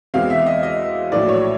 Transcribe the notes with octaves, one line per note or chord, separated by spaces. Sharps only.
E2 B2 G#3 C4 F5
E5
D#5
D#5
A#1 A2 F#3 D5
C#5